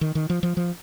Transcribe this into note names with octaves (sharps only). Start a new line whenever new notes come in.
D#3
D#3
F3
F3
F3